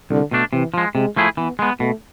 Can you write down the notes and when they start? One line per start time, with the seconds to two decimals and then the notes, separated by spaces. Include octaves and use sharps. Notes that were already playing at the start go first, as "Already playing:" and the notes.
0.10 C2 D3
0.31 B2 A3 D4
0.53 C3 E3
0.74 F3 G#3
0.95 C3 G#3
1.16 F3 A3 E4 G#4
1.37 E3 B3
1.59 G#3 B3
1.80 B2 A3